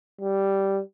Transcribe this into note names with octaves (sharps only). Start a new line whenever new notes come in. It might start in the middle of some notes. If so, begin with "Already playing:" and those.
G3